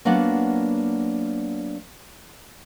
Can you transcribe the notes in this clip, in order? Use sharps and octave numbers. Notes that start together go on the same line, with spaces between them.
F#3 A#3 B3 D4 F#5